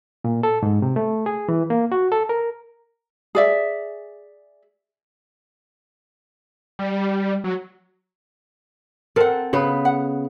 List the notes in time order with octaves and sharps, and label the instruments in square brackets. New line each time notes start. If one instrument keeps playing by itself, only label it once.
[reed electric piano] A#2
A4
G#2
C3
A3
G#4
E3
A#3
F#4
A4
A#4
[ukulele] G#4 D5 E5
[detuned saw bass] G3
F#3
[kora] C4 A4 [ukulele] A#4 F#5
[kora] C#3 B3 B4
[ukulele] F#5